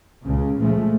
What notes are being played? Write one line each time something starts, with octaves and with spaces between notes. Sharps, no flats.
C#2 C#3
A#2 F3 G#3 A3